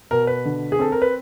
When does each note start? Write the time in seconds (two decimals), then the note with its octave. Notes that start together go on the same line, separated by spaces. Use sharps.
0.11 B2 A#4
0.27 B4
0.45 D3
0.72 G#4
0.79 C4 A4
0.92 A#4
1.02 B4